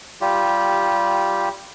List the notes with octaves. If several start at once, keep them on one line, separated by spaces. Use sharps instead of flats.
G3 F4 G4